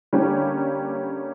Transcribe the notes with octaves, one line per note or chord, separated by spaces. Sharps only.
D3 G3 A#3 C#4 G4